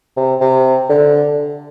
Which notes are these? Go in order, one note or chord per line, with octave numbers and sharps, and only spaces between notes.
C3
C3
D3